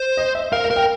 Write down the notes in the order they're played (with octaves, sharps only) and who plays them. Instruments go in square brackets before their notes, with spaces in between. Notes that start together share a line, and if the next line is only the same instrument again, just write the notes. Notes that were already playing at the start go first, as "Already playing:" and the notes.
Already playing: [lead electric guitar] C5
[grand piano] D#5
E5
[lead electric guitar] A#4 [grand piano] F5
[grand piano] F5
[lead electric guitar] A#4
[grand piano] G5